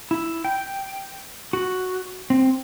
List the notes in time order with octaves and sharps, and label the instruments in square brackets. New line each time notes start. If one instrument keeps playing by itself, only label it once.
[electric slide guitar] E4
G5
F#4
C4